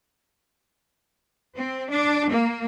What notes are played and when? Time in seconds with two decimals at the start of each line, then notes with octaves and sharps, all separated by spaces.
1.56 C4
1.89 D4
2.31 A#3